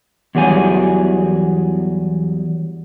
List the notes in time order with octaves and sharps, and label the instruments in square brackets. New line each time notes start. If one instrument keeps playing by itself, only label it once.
[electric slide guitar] E2 F#3 G3 G#4 G#5